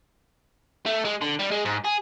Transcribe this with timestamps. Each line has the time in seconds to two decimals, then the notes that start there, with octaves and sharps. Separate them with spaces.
0.86 A3
1.05 G#3
1.21 D3
1.39 G3
1.51 G#3
1.65 G#2
1.84 G#4